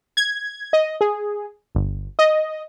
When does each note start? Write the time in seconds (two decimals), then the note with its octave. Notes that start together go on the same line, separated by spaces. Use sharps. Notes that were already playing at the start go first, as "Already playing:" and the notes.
0.17 G#6
0.73 D#5
1.01 G#4
1.75 G1
2.19 D#5